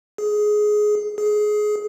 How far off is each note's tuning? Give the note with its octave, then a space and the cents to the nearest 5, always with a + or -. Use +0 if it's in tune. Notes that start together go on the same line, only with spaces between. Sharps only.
G#4 +15
G#4 +20